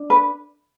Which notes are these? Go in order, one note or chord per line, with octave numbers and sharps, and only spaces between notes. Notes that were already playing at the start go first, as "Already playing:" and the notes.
Already playing: D4
B4